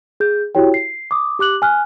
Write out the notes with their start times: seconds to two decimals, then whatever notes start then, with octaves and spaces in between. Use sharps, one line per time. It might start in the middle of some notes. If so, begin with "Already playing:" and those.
0.20 G#4 G6
0.55 E4 F#4 G4 C#5 G5
0.74 C7
1.11 D6 D#6
1.39 G4 D6 F#6 F#7
1.62 G#5 F6 F#6